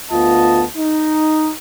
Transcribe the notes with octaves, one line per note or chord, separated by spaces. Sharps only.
D2 B3 F4 D#5 A5
D#4